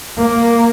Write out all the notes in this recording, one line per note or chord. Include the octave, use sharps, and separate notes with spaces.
A#3